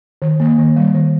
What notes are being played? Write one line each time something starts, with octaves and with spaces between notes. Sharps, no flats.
D#3
A#3
D#3
G3
D#3